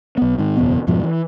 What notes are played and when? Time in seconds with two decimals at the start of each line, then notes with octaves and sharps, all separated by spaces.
0.17 B1 B3
0.38 G#2 D#3
0.57 F#1 E2 B2 B3
0.87 F2 G#2 B2 F3
1.03 E3